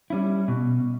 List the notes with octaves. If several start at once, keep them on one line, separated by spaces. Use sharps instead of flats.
G3 C#4 E4
B2